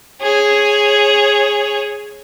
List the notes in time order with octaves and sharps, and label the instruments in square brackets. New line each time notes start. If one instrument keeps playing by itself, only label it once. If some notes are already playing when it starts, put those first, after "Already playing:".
[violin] G#4 C#5